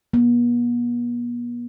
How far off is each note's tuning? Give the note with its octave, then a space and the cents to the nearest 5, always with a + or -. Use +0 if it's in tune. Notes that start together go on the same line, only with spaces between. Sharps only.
B3 -45